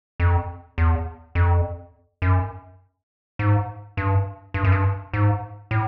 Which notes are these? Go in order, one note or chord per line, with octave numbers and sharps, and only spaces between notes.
F2
E2
F2
F#2
G#2
G2
G2
F#2
G2
G#2
A2